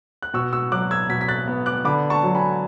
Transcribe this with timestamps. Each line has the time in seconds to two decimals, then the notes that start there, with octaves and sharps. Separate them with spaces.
0.22 F#6
0.34 B2 C#6 E6
0.53 C#6 E6
0.72 F#3 D6 F#6
0.91 E6 G#6
1.09 B2 G#6 B6
1.21 B6
1.28 F#6 A6
1.48 B3
1.66 D6 F#6
1.85 D3 B5 D6
2.10 A5 C#6
2.23 F#3
2.35 G#5 B5